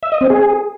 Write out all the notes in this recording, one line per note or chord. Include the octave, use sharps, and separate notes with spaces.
E5
D#5
C4
G#4